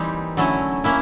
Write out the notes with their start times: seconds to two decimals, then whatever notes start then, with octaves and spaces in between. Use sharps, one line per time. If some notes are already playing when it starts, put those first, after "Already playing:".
Already playing: E3 G3 A#3 C4 D#4 G4
0.37 D3 F#3 A3 C#4 E4
0.84 A#3 C#4 E4